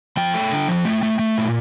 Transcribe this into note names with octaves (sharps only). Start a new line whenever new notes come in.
F3 G5
A3
D3
F3
A3
A3
A3
A#2